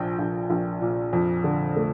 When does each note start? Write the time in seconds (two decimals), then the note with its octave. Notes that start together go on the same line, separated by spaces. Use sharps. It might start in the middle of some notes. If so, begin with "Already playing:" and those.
Already playing: A#1 A#2 F3 G5
0.19 A#1
0.50 A#1
0.81 A#2
1.13 F2
1.44 D3
1.76 A3